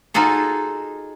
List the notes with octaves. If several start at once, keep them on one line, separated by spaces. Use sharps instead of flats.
D#4 F4 F#4 G#4 A4